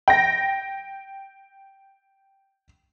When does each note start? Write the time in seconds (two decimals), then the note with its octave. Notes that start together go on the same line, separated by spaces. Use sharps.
0.08 G5 A#6